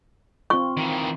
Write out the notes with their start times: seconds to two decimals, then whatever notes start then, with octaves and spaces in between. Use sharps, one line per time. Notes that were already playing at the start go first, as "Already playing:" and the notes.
0.50 C4 F4 C#6
0.77 D#3 E3